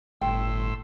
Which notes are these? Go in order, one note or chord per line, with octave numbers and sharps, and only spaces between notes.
G1 A2 G5 C6 E6